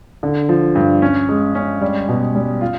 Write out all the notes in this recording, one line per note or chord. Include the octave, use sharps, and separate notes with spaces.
D3
F3
G2
C#4
G#3
C#4
G3
B2
G3
F4